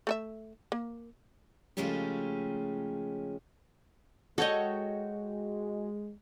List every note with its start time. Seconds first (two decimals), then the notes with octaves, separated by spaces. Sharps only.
0.07 A3 A4 E5
0.72 A#3
1.77 C#3 F3 G#3 A3 C#4 G4
4.38 G#3 F#4 A4 C#5 D#5 G5